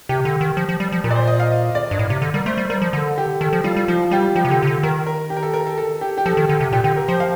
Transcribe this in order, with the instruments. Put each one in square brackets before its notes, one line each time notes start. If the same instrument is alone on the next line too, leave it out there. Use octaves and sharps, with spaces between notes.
[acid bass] C3 [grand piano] G4
[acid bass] D3
D#3
F3
F3
G3
F3
[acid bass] A#2 [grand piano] A#4
[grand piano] D5
C5
D#5
F5
D#5
D5
[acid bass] G2
A2
C3
D3
[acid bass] G3 [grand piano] A#4
[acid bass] A3 [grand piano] C5
[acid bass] G3
[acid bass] G3 [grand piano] A#4
[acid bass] F3
[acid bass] D3 [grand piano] A4
[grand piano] G4
[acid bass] D#3 [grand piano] A4
[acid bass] F3
[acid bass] G3 [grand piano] F4
[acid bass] G3
[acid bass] F3 [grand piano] F4
[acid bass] G3 [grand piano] G4
[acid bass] F3 [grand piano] G4
[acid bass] C3
[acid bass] D3 [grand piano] G4
[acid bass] C3
D3
[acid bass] D#3 [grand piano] A#4
[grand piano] A#4
G4
A#4
A4
A#4
A4
A4
G4
G4
[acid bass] F3 [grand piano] A4
[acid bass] D#3
D3
C3
[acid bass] A#2 [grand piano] G4
[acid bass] D3 [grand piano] G4
[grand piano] A#4
[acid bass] F3 [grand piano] C5
[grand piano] F5